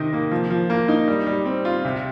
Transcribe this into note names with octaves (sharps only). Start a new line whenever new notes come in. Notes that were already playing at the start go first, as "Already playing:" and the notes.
Already playing: C3 D#3 D#4
A#3
F3
F3
A#3
D#4
G3
G3
C4
F4
C3